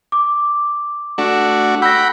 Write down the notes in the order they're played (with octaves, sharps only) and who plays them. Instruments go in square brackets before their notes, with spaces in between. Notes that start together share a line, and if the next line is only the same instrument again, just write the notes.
[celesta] D6
[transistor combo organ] A3 D4 F#4
[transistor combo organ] F#5 G5 B5 [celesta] E6 A#6